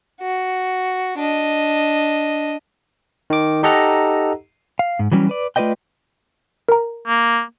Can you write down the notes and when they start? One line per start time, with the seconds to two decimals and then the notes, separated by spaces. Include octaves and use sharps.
0.21 F#4
1.19 D4 D#5
3.30 D#3 D6
3.63 D#4 G4 A4 D#5 F#5 A#5
4.79 F5
4.99 G#2
5.12 E3 F#3 G3 A#3 C#4
5.29 B4 D5
5.56 A3 F4 B4 D5 D#5 G5
6.69 A#4 A#5
7.08 A#3